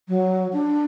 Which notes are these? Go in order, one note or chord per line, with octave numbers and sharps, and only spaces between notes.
F#3
D4